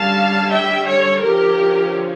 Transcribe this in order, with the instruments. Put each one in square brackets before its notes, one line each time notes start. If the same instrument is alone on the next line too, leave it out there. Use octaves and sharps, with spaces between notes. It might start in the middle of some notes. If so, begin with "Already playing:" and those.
Already playing: [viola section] D3 G3 C#4 F5 A5
E5 G5
A4 C#5
D3 F3 C#4 G4 A#4